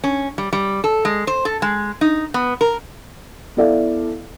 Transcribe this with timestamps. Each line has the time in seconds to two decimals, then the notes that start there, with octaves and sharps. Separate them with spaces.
0.04 C#4
0.38 G3
0.53 G3
0.84 A4
1.05 G#3
1.27 C5
1.45 A4
1.62 G#3
2.01 D#4
2.34 B3
2.61 A#4
3.57 B3 E4 A4 D5 E5 F5